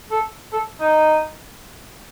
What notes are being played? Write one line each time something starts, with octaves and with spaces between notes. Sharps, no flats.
A4
A4
D#4